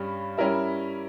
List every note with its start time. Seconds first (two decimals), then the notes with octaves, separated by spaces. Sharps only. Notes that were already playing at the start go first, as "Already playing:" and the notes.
Already playing: G2 G3 C#4
0.37 G3 C#4 E4 A#4 E5